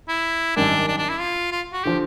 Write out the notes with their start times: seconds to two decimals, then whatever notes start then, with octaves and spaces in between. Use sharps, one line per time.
0.09 E4
0.56 G#1 F#2 D#3 G3 D4
0.88 D4
0.98 D4
1.09 E4
1.20 F4
1.52 F4
1.73 F#4
1.84 D3 F3 G4